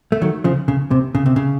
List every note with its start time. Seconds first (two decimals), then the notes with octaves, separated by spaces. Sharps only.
0.12 A3
0.22 D#3 F#3
0.44 C#3 F3
0.68 C#3
0.91 C3
1.15 C#3
1.26 C3
1.36 C#3